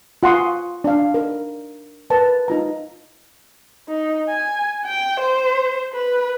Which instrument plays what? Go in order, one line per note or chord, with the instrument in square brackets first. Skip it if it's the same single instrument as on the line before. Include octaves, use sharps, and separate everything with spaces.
[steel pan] F4 F#5 G#5 C6 C#6 D#6
D4 F5
A#4
A#4 B4 A5
D#4 F4 A#5
[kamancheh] D#4
G#5
G5
C5
B4